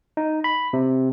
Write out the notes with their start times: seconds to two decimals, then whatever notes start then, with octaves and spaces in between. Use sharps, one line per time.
0.17 D#4
0.44 B5
0.73 C3